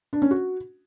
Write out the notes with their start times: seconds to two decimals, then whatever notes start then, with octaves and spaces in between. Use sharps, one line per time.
0.13 D4
0.22 C#4
0.31 F#4